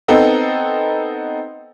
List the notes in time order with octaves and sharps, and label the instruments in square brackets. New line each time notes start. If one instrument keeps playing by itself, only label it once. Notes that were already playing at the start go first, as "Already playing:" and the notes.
[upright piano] B3 C4 D#4 A4